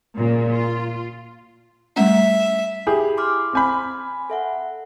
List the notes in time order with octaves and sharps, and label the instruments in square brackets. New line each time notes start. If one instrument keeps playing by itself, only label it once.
[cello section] A#2 C#3
F4
[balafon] G3 A3 C#4 [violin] E5
[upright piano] E4 G4 G#4 [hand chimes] B5
[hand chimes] C6 D6 F6
[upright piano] C4 G#5 B5
[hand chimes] A4 E5 F#5